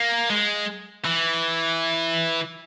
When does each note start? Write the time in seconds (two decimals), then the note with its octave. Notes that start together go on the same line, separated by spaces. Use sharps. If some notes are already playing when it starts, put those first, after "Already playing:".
Already playing: A#3
0.30 G#3
1.05 E3